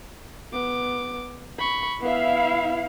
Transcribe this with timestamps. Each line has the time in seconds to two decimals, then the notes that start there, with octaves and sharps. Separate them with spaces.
0.53 B3 D6
1.59 B5 C#6
2.01 B3 E4 E5 F5